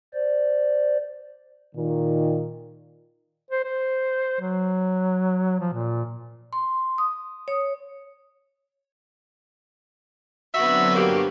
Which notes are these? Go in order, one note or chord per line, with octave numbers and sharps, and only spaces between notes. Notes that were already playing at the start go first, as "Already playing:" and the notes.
C5 D5
A#2 D#3
C5
C5
F#3
F3
A#2
C6
D#6
C#5
D3 F#3 B3 C4 F#4 E5
G2 A#3 G4